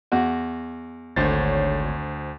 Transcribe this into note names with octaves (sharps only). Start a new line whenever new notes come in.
E2 F#4
G#1 D2 D3 C5 C#5 A6